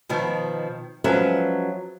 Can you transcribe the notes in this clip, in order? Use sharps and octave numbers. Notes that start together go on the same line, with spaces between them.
B2 D#3 F3
F3 F#3 G#3 C#4 B4 E5